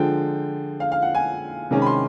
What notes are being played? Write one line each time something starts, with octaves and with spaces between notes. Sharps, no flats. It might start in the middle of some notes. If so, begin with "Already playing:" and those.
Already playing: D3 F3 G#3 G5
F5
F5
F#5
G#5
C3 D#3 G#3 C#4
B5
C6